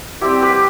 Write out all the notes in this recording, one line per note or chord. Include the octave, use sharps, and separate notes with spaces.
G3 C4 E4 G4
G4 B4